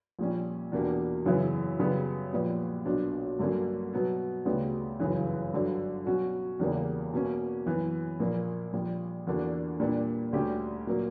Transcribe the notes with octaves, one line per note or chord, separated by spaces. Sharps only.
A#1 A#2 G3 C#4
E2 B2 A#3 D4 G4
F#2 C#3 E3 B3 E4
F#2 C#3 G3 B3
A#1 A#2 G3 B3
B1 B2 A#3 D4
G2 D3 F#3 A#3 C#4
B2 F#3 B3
D2 C#3 G3 B3
G1 F#2 C#3 E3
G2 D3 F#3
B2 F#3 C#4 F#4
E2 C#3 G3 A#3
B2 A#3 C#4
F#2 E3 B3
A#1 A#2 A#3
A#1 A#2 G3
E2 D3 A#3 D4 F#4
A#2 G3 A#3 D4
D2 D3 G3 C#4 G4
A#2 F#3 A#3